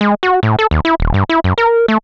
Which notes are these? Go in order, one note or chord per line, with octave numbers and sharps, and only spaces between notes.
G#3
F#4
A2
A4
D#2
E4
D#1
G2
E4
F#2
A#4
A3